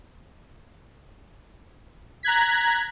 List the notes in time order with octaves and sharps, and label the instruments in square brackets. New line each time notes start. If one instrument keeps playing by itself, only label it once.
[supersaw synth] A#5 F#6 G#6 B6